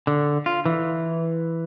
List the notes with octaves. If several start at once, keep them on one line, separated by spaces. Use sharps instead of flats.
D3
F4
E3